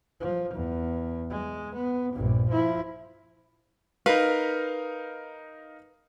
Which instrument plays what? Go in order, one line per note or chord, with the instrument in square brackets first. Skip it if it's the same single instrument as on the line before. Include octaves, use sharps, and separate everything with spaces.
[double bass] F3
E2
G#3
B3
A#1 G2
F3 E4
[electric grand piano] D#4 A#4 F5 [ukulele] B4